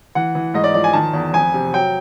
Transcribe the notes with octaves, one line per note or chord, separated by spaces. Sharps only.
E3 F#5
E3
G#2 D#5
D5
F3 D5
G#5
D#3 A5
E2
F2 G#5
C3
F#3 G5